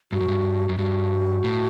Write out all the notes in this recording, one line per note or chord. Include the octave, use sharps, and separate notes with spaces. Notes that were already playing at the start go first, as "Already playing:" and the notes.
G2 F#4
F#2
G2
F#2
G2 F#4
A2